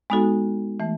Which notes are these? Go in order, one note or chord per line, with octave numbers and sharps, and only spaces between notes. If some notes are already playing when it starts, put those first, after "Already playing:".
G#3 B3 D#4 F#4 A4
E3 A3